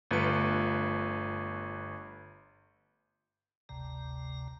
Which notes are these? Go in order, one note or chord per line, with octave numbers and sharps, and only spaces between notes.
G1 A3 F4 B4 C#7
G1 D2 C3 A#5